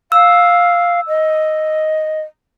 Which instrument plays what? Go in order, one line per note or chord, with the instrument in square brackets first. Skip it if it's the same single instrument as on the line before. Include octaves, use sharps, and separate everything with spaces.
[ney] F5 [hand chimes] E6
[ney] D#5